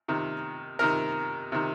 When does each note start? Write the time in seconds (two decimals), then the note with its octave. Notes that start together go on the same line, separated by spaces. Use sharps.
0.08 C3 D#3
0.79 C3 D#3 A#4
1.52 C3 D#3